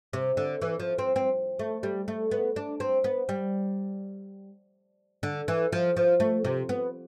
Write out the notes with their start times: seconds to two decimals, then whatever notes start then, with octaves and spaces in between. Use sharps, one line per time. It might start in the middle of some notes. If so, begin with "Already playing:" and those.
0.13 C3
0.37 D3
0.62 E3
0.80 F3
0.98 C4
1.16 C4
1.59 A3
1.83 G3
2.08 A3
2.31 B3
2.56 D4
2.80 C4
3.04 B3
3.29 G3
5.23 D3
5.48 E3
5.72 F3
5.97 F3
6.20 A3
6.44 C3
6.69 B3